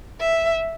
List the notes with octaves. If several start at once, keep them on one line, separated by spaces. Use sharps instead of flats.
E5